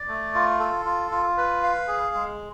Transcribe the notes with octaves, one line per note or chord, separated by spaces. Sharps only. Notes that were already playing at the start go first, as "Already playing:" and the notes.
Already playing: D5
A3
F4
A4
F4
F4
B4
F5
G#4
G#3